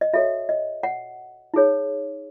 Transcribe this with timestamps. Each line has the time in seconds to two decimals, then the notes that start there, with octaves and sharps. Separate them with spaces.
0.01 D#5
0.13 F#4 A4 C#5 E5
0.49 D#5
0.83 F#5
1.54 D#4 G#4 C#5